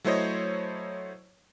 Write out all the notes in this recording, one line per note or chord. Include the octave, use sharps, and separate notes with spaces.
F#3 A3 E4 C5 C#5 D#5